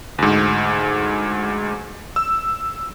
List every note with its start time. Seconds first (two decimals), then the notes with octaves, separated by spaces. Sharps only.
0.19 D2 G#2
2.16 E6